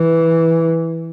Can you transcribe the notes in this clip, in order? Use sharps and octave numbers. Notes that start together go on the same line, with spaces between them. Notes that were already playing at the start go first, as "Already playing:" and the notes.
Already playing: E3